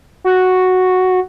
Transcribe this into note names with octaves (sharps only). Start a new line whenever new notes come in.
F#4